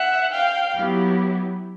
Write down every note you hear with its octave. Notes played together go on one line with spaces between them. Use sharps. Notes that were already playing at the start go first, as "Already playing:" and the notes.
Already playing: E5 F#5
F5 G5
F#3 B3 E4 G4